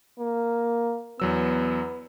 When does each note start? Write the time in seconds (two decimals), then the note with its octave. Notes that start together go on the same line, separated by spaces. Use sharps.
0.19 A#3
1.20 E2 F#3 B3 E6